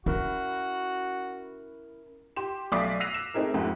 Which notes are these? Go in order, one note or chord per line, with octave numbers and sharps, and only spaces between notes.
C#4 E4 F#4 A#4
G4 C6 E7
B1 A3 D5 D6 B6 C7
E6 F#6 A#6 C7 D#7 F7
E7
A3 C4 D#4 G#4 A#4
F2 G#2 A3 G4